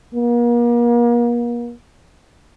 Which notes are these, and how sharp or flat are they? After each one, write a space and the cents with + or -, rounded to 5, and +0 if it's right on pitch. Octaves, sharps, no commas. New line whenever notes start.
A#3 +40